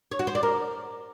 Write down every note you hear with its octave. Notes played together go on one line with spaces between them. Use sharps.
C#5
F#4
C5
D5
A#4